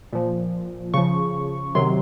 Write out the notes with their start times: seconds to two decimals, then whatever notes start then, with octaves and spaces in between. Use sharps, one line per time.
0.13 A#2 F3
0.94 C#3 F3 C#6
1.75 C3 D#3 F#3 C6